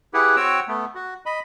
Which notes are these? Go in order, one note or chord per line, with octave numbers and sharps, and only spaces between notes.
E4 G4 G#4 B4 F#5
C4 F#4 C#5 G5 E6
A3 B3
F#4
D#5 B5